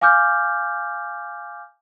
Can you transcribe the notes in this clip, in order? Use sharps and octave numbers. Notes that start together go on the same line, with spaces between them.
F5 G#5 D6 F6 G6